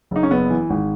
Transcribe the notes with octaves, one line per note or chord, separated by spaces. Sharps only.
F#1 D#4
C#4
F#1 B3
E3
G#1